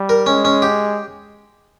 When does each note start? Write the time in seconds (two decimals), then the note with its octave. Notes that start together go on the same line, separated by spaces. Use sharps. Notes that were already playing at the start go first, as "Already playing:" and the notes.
Already playing: G3
0.09 A#4
0.26 G#3 C#4
0.45 C#4
0.62 G4